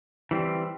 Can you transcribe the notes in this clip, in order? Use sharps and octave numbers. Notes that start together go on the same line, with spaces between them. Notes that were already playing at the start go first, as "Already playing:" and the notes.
E3 G3 C4